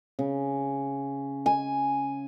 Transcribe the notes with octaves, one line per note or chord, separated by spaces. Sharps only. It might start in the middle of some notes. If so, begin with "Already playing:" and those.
C#3
G#5